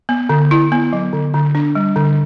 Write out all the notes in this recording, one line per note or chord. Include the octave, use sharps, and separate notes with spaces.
B3
D3
E4
B3
F#3
D3
D3
D4
G3
D3